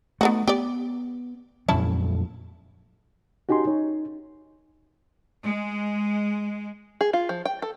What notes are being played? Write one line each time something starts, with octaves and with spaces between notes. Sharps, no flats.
A3 B3 D#4 F#4
B3 G4 D5
F2 A#2 F#3 C#4 E4 A5
C#4 D#4 F#4 G4 G#5 C6
D#4 C#5
G#3
G#4
F4
F3
G5
A4